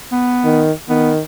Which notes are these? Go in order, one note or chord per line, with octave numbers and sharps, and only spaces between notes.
B3
D#3
D#3 B3